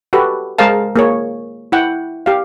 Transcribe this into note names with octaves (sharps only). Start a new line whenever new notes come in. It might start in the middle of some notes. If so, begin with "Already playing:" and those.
F#4 G4 A4 B4
G#3 G#4 A#4 C5 F5 A5
A#3 G#4 C#5
E4 F#5 G5
G4 F5